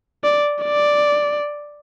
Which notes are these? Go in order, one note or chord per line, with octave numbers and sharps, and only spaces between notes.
D5
D5